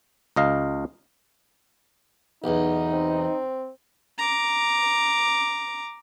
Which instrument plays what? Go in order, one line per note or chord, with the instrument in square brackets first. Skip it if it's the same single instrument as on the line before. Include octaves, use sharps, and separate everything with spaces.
[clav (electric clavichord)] C#2 D#5 F5
[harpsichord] B1 E2 [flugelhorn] D#4
[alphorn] C4
[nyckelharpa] A#5 D6